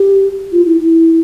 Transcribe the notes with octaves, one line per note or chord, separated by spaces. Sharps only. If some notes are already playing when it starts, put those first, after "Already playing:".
Already playing: G4
F4
E4
E4